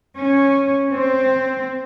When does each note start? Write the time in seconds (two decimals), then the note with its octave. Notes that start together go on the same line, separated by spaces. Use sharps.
0.19 C#4
0.93 C4